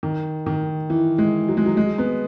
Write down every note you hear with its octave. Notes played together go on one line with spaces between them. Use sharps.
D#3
D#3
E3
G#3
F#3
G#3
F#3
G#3
B3